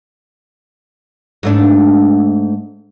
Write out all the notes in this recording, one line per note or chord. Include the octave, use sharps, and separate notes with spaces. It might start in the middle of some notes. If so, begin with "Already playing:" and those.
G#2 A3 D4